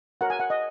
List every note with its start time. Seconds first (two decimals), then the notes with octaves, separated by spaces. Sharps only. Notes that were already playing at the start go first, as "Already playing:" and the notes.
0.21 F#4 A#4 C#5 F#5
0.30 G#5
0.40 F#5
0.50 D#5